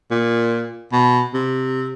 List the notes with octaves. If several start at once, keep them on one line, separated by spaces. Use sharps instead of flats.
A#2
B2
C3